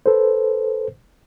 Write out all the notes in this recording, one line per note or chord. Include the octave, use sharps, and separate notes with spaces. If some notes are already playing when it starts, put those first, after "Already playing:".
A4 B4 C5